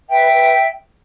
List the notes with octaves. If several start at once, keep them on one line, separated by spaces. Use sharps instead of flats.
B4 E5 G5
B4